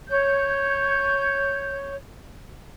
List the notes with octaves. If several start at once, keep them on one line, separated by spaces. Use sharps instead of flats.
C#5 G6